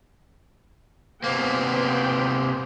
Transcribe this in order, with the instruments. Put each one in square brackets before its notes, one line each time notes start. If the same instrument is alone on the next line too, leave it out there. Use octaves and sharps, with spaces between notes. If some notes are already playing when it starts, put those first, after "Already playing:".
[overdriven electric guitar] C3 A#3 [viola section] B3 C5 G5